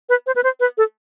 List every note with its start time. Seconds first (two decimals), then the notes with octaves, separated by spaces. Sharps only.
0.09 B4
0.27 C5
0.36 B4
0.44 C5
0.60 B4
0.78 A4